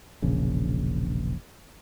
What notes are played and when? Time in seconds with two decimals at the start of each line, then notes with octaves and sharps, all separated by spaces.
0.22 E1 A#1 C#3